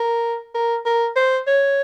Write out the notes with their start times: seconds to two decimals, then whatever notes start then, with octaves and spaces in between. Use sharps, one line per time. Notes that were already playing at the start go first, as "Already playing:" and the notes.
Already playing: A#4
0.54 A#4
0.86 A#4
1.16 C5
1.47 C#5